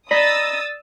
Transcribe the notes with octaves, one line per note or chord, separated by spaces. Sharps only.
D5 D#5 A#5 B5 D#6 E6 A6